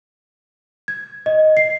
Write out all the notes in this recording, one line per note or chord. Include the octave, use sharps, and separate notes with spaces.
G#6
D#5
C7